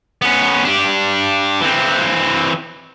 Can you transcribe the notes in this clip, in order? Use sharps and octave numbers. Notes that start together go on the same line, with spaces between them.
B3 C#4
D4 G4
E3 C4